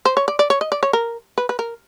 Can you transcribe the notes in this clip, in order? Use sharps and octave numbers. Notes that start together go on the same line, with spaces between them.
C5
C#5
D5
D5
C#5
D#5
D5
C#5
A#4
B4
B4
A#4